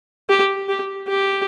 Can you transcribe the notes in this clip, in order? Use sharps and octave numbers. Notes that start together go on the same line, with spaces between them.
G4
G4
G4